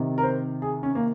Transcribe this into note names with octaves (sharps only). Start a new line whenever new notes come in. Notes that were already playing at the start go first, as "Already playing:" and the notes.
Already playing: C3 D#3
A#4
C5
G#4
C#4
A#3